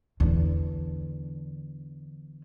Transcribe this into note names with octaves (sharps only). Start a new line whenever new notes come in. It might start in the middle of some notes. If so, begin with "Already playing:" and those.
E2 D3